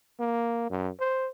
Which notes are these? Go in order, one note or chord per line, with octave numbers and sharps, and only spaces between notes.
A#3
F#2
C5